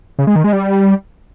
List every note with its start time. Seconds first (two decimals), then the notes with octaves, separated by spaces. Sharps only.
0.19 C#3
0.27 G#3
0.36 D#3
0.44 G#3
0.53 G3